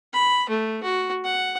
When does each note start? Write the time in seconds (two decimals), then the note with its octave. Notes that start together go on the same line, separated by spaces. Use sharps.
0.13 B5
0.49 A3
0.83 F#4
1.24 F#5